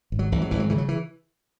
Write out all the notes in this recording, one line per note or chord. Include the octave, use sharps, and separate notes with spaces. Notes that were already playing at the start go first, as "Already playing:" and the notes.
G#1
F#3
G#1 E3
F#3
G#1 E3
F#3
C#3 E3
F#3
E3